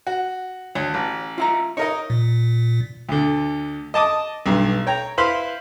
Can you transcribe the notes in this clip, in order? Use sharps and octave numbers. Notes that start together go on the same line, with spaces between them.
F#4
D2 C#5
A1
F4 E5 A#5
D#4 A#4 C#5 D#5
A#2
D2 D3
D#5 A5 D6 D#6
B1 G2
C#5 G5 A#5
E4 B4 C5 F5 B5 C6